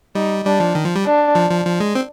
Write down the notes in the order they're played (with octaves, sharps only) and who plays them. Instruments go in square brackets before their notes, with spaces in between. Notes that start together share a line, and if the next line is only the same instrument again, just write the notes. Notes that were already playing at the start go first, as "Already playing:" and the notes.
[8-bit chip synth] G3 [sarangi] D#4
[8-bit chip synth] G3 [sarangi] D4
[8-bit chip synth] F3
D#3
F3
G3
[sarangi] D4
[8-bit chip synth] F3
F3
F3
G#3
C4